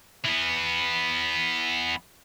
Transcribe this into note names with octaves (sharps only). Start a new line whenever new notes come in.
E3 B3